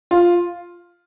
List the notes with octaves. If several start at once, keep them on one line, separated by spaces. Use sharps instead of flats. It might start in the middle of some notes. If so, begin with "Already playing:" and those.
F4